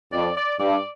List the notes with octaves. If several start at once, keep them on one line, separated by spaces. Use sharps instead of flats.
F2 D5
D5
G2 D5